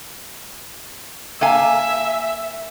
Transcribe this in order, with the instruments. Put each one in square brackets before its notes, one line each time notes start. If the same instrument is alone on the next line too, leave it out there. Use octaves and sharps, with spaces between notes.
[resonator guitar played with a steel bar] A#3 F5 G#5 [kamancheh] E5